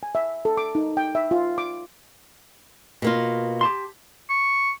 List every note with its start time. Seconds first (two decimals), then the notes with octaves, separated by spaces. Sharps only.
0.03 G#5
0.15 E5
0.45 A4
0.57 D6
0.75 D#4
0.97 G5
1.15 E5
1.31 F4
1.58 D6
3.02 B2 A#3 F4
3.61 G4 A5 C6
4.30 C#6